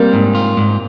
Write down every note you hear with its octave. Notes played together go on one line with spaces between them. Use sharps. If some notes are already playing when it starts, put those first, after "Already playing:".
Already playing: G3 A#3 C4
G#2
F4
G#2